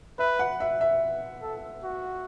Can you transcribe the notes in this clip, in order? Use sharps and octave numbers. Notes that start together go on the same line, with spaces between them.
B4 E5
F#5
E5
E5
A4
F#4